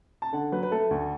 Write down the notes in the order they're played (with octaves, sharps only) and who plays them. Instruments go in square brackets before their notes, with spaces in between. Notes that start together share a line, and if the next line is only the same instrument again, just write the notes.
[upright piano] A5
D3 F#5
F#3 B4
B4
A3 A4
D2